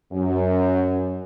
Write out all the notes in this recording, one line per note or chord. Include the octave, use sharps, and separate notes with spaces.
F#2